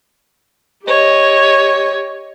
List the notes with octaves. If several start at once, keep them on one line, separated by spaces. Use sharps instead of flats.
G4 C#5 D#5